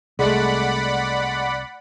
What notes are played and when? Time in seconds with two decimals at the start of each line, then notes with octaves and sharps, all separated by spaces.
0.19 C2 G#3 A3 D5 F#5 B5